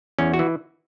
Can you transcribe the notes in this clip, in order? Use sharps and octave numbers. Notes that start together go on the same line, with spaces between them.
E2 C#4
F#4
E3